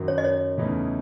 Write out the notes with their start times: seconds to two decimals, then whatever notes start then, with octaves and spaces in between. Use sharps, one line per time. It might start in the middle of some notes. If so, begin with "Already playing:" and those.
Already playing: F#2 D#3 F#3
0.08 C#5
0.18 D#5
0.24 C#5
0.58 E2 C#3 E3 A3 D#4